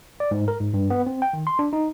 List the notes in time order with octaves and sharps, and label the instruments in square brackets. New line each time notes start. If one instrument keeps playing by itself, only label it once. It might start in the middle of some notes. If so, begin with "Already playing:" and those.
[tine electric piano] D5
G#2
A#4
G#2
G2
B3
C4
G5
D#3
C6
D4
D#4